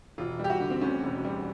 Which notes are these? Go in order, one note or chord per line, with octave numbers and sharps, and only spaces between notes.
E1 F4
G3
G4
F#4
D3
C4
D2 C#4
E1
G3